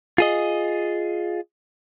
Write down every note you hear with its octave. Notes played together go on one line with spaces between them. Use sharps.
F4 G#4 D#5